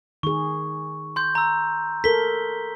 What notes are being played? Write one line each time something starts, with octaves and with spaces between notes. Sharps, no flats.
D#3 G#4 C#6
C6 G6
A#5 E6
A4 A#4 B6 G7